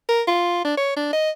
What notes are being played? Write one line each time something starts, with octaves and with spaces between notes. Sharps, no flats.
A#4
F4
D4
C#5
D4
D#5